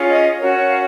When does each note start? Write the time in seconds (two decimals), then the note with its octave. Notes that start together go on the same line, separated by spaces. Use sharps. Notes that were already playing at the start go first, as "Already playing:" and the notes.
Already playing: C#4 F4 G#4 C#5
0.10 D#5
0.39 C#4 F#4 A#4 C#5
0.68 F5